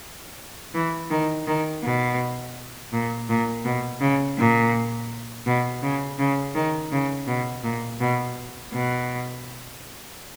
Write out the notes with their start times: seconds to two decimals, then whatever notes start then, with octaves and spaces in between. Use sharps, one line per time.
0.74 E3
1.11 D#3
1.47 D#3
1.84 B2
2.93 A#2
3.29 A#2
3.65 B2
4.01 C#3
4.38 A#2
5.46 B2
5.83 C#3
6.19 C#3
6.55 D#3
6.92 C#3
7.27 B2
7.64 A#2
8.00 B2
8.73 B2